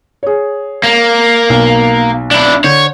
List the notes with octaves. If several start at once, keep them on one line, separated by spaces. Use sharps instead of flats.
G#4 C#5
A#3
B1
D4 E4
D3 C#5 G6